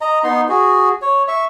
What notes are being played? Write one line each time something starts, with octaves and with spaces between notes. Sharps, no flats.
D#5 A#5
B3 D#4 C6
F#4 G#4
C#5
E5 C#6